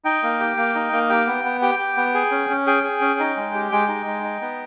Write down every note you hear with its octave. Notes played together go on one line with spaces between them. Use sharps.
D#4 G5
A#3
G4
A#3
D#4
A#3
G4 G5
B3
B3
G4 G5
G4
B3
G#4
C#4
C#4
G#4 G5
G#4
C#4
D#4
G#3
G4
G#3 G5
D#4
G#3
D#4
B3